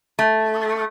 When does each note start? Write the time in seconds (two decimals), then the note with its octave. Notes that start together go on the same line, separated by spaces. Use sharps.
0.19 A3